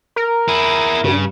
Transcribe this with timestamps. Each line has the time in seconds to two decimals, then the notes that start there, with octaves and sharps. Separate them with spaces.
0.16 A#4
0.48 E4 G#4
1.04 G2 C#3